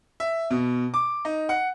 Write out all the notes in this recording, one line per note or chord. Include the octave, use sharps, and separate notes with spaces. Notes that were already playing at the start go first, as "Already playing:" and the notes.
E5
B2
D6
D#4
F#5